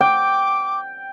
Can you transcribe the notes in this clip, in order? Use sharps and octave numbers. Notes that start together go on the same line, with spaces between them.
G5 D6